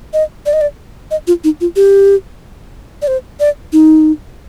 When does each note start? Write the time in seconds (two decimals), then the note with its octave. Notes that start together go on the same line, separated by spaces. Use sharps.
0.13 D#5
0.46 D5
0.53 D#5
0.61 D5
1.11 D#5
1.27 F4
1.44 D#4
1.61 F4
1.76 G4
3.02 D5
3.07 C5
3.40 D5
3.73 D#4